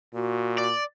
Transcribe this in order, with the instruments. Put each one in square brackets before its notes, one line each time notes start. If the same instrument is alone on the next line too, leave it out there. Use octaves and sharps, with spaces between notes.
[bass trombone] A#2 [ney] F#4
[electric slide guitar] D5